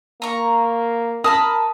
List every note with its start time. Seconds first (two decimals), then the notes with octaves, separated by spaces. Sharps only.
0.22 A#3 A#5 C#6
1.24 A#4 A5 B5 D#6